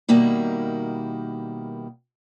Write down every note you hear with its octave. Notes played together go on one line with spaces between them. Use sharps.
B2 D#3 G3 A#3 E4